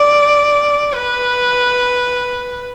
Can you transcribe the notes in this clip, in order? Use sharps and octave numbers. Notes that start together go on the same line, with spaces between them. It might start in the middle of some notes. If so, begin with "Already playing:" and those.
Already playing: D5
B4